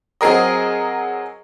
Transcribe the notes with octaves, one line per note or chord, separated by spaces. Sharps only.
F#3 C4 G#4 A#4 D#5